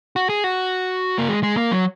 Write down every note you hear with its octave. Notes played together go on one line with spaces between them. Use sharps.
F#4
G#4
F#4
A#3
G#3
G#3
A#3
F#3